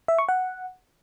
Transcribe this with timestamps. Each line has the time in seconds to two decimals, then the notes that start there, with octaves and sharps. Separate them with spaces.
0.08 E5
0.18 C#6
0.29 F#5